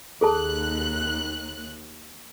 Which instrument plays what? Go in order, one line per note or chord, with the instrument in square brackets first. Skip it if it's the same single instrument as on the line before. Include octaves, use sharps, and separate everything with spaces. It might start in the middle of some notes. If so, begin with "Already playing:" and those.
[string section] D#2 F#6 [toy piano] G#4 A4 A5